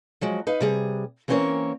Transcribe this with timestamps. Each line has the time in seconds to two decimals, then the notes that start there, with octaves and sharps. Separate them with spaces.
0.21 F3 F#3 G#3
0.47 D#4 B4 F5
0.60 C3 G3 G#4
1.28 E3 A#3 C4 C#4 A#4 C#5